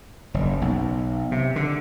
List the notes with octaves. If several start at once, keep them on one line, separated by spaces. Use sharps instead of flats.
F#1
B1
C3
D3